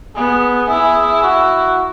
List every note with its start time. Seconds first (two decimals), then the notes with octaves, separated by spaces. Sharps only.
0.16 B3 G#4
0.69 E4 G#4
1.23 F#4